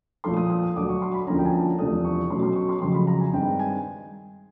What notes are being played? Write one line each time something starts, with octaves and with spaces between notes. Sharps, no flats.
A#2 F3 A3 C6
D#6
D#6
D#6
D2 D3 F#3 D6
C#6
C6
B5
D2 D3 F3 A#3 C#4 A#5
G5
G#5
A5
E2 C3 F3 A3 D4 D#6
C#6
B2 F#3 A3 C#4 C6
C6
C#6
C6
F2 C#3 F#3 C6
B5
A#5
G#5
G2 D#3 G#3 C4 G5
G#5